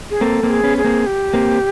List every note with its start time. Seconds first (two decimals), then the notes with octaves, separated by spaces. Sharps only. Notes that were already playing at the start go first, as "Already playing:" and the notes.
0.11 G#4
0.21 A#3 C4 A4
0.43 A#3 C4
0.50 G#4
0.64 B3 C#4
0.78 G#4
0.84 A#3 C4
1.06 G4
1.34 A#3 C4